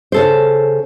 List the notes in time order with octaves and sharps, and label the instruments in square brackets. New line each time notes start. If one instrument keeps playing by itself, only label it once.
[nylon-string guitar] C#3 A4 C5